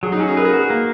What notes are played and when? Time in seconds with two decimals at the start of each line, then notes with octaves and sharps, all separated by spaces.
0.03 F#3 G#4
0.12 D#4
0.19 C#4 F#4
0.28 G#4
0.37 A#4 B4
0.45 G#4
0.53 F#4
0.70 A#3